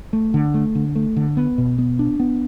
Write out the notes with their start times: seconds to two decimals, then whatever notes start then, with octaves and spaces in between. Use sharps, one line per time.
0.13 A3
0.34 D3
0.54 A3
0.75 D3
0.95 A3
1.16 D3
1.37 B3
1.58 B2
1.78 B3
1.99 D4
2.20 B3